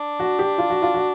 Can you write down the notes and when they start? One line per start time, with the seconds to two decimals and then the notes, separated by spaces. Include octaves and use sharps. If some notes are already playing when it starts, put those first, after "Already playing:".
Already playing: D4
0.20 F#4
0.39 G4
0.58 F4
0.70 F#4
0.82 F4
0.94 F#4